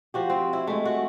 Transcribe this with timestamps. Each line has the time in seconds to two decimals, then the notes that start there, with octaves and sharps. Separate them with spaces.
0.14 F3 F#4 G4
0.30 C4
0.53 E4
0.67 G#3 A3
0.85 F#4